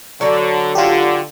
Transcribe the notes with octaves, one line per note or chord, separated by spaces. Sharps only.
D3 F#3 A4 D5
D3 F4 G4